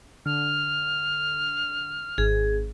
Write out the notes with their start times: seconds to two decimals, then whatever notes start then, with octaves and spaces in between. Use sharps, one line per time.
0.26 D3 F6
2.18 G#1 G#4